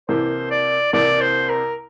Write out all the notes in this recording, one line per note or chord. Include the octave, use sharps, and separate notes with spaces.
C2 C3 E3 A#3 C5
D5
C2 C3 E3 A#3 D5
C5
A#4